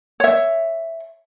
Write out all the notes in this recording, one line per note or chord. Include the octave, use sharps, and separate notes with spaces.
C#5 E5